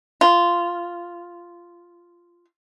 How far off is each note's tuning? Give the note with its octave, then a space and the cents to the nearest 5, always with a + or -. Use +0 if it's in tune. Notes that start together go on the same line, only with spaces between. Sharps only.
F4 -10